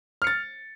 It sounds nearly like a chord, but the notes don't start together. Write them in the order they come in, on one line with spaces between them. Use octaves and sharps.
F6 C#7 A6